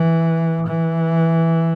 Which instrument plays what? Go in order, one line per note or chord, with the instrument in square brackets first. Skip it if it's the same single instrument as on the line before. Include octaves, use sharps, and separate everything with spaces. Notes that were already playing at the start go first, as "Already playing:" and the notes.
Already playing: [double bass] E3
E3